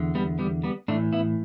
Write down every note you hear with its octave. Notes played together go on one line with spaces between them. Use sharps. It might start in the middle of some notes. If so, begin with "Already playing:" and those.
Already playing: E2 D3
G3 B3
G3 B3
G3 B3
A2 E3 A3 D4
B3 E4